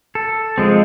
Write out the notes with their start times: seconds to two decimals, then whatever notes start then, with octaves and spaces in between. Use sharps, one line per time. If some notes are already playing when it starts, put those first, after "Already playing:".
0.15 A4
0.58 F3 G#3 C4